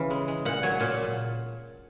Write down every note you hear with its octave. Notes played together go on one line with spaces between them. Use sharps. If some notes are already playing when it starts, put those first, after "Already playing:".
Already playing: C#3 E3 F5
G#3
G#3
A#2 F#5
F#3 G#5
A#2 A5